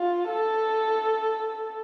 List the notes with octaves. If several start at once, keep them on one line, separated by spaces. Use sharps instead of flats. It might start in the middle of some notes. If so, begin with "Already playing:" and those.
Already playing: F4
A4